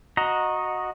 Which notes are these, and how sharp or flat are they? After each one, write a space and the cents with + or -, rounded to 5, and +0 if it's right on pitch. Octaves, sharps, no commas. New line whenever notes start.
F#4 -15 D#5 +0 A#5 +0